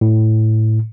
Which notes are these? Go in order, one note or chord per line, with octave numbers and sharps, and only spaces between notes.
A2